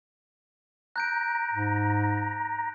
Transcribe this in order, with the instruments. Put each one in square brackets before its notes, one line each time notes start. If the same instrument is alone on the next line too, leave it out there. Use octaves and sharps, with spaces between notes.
[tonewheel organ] A#5 [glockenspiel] F#6 G6 D7
[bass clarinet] G#2